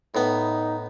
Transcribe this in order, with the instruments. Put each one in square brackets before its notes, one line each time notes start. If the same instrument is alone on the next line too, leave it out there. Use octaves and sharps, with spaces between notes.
[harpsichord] A2 B3 [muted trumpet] D#4